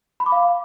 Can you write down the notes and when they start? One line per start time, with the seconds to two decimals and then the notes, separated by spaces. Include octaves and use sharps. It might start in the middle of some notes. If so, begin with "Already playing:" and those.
0.20 B5
0.26 D6
0.32 F5